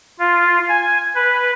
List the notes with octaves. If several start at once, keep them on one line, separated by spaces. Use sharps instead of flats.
F4
G#5
B4